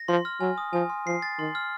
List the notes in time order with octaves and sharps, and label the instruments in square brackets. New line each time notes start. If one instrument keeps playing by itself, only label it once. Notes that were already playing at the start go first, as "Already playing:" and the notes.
Already playing: [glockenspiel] A#6
[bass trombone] F3 [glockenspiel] C6
[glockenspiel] F6
[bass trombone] F#3 [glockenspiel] G#5
[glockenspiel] D#6
[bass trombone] F3 [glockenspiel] G#5
[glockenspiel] C6
[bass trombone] F3 [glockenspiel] C7
[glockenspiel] A6
[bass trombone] D#3 [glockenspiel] C6
[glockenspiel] F6